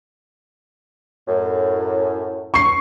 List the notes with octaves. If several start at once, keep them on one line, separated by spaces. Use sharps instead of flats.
F#2 A2
C#6 C7